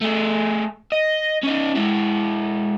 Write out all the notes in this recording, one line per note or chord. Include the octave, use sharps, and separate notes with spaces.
A3 G#4
D#5
C#4 D#4
G#3 E4